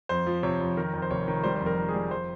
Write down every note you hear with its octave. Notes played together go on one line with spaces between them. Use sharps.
F2 C5
F3
C3 C#5
F2
D#3 A#4
F2
C5
F1 C#5
D#3
G3 C5
F2 C5
A#4
D#3
G#4
G3
F2 C5